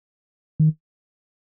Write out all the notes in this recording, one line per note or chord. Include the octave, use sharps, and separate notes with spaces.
D#3